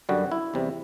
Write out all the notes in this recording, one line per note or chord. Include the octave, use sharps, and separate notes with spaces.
F#2 D3 G3 F#4
E4
E2 C3 G3